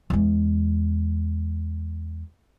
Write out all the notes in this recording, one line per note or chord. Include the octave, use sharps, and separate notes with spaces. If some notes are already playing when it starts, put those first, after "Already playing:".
E2 G#3